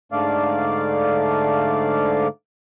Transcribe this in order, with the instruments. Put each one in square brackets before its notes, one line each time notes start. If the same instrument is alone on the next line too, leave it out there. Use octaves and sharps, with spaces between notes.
[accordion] G#2 D3 A3 D5 F5